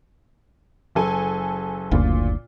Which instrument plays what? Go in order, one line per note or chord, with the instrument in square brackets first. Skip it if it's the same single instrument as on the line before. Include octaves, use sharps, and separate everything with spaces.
[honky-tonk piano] F#1 A4 G#5
[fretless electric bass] F#1 D2 [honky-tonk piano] A#2 F4